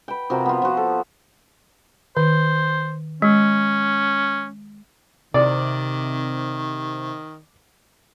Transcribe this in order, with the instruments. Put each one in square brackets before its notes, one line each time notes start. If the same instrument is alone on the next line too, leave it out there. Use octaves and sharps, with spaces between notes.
[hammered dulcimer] B4 G5
C3 F3 F#4 A#4
B3 F4
F3 F#4
A4
[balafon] D#3 [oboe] C5
[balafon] G#3 [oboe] C#4
[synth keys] C3 [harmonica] D#3 [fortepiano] D5